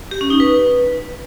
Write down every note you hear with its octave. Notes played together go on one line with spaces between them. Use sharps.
G4
C#4
D#4
B4